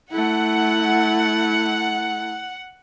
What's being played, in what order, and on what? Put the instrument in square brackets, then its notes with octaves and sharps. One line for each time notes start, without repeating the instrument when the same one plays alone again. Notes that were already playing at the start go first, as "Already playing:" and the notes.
[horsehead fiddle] A3 E4 [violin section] F#5